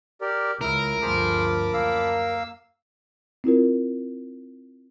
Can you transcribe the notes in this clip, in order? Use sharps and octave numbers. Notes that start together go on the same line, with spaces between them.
G4 A#4 D5
C#2 E4 A#4
D2 G2 F3 G#4 C5 A5 B5 D6
F#2 A#3 F5 E6
C4 E4 F4 A#4